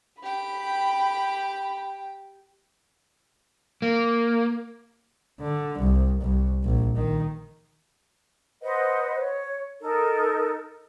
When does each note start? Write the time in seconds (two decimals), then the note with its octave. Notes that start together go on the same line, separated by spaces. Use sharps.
0.22 G4 G5 B5
3.82 A#3
5.40 D3
5.79 C2
6.21 C2
6.64 A#1
6.96 D#3
8.62 B4 C5 D#5 F#5
9.18 C#5
9.81 D#4 A4 A#4